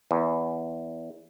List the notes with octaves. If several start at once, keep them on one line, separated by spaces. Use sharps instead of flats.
E2